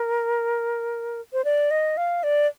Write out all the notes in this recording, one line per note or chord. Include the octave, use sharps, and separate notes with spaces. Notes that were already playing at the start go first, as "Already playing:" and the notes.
Already playing: A#4
C5
D5
D#5
F5
D5